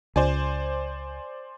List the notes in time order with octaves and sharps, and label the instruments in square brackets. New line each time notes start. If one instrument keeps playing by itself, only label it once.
[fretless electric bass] C#2 [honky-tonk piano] C5 D5 G#5